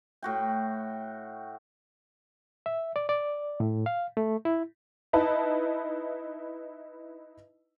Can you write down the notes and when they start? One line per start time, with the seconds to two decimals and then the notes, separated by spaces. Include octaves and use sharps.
0.22 A2 F#4 G5
2.66 E5
2.96 D5
3.09 D5
3.60 A2
3.86 F5
4.17 A3
4.45 E4
5.13 D#4 E4 B4 A5